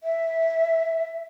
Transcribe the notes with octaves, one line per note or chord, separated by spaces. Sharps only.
E5